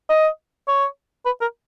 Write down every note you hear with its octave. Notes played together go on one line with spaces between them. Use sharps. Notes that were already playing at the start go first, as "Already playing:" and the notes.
D#5
C#5
B4
A#4